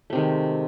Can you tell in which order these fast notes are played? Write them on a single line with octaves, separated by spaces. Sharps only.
A3 C3 D#3 G#3